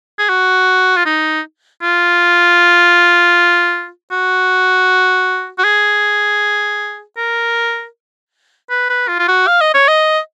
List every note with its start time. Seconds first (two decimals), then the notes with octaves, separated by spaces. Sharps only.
0.19 G#4
0.29 F#4
0.96 F4
1.06 D#4
1.82 F4
4.11 F#4
5.58 F#4
5.64 G#4
7.17 A#4
8.70 B4
8.89 B4
9.08 F4
9.19 F4
9.28 F#4
9.47 F5
9.61 D#5
9.74 C#5
9.88 D#5